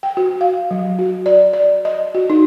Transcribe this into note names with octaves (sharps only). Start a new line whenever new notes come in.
G5
F#4
F5
F#3
F#4
D5
D5
D#5
F#4
D#4